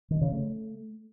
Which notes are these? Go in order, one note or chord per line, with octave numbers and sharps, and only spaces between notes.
D#3
C#3
A3